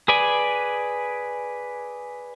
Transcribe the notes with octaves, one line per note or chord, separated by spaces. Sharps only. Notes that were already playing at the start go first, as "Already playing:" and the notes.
G#4 B4 D5 G#5